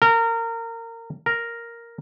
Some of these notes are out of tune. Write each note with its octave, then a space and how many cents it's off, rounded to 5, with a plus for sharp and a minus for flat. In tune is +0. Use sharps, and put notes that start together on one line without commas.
A#4 -25
A#4 +0